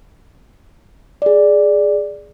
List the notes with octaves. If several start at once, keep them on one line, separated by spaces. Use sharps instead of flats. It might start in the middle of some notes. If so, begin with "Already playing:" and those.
G#4 D5